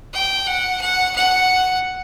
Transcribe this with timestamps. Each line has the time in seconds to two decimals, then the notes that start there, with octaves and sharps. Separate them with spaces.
0.13 G5
0.47 F#5
0.81 F#5
1.16 F#5